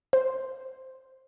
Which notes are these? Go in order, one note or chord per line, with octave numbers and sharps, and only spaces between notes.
C5